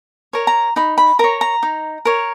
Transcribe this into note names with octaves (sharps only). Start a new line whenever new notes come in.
A#4 C#5
A#5
D#4 B5
B5
A#4 C#5 A#5
A#5
D#4
A#4 C#5